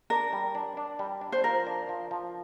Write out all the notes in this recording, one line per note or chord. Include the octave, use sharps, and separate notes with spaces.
D4 A#4
G3
D4
D4
G3
D4
C5
F3 A#4
D4
F3
F3